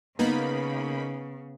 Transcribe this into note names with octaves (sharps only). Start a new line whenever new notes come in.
C#3 A#3 B3 D#4 B5